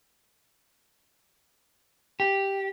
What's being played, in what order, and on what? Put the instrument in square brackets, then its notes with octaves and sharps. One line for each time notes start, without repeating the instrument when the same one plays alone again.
[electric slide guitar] G4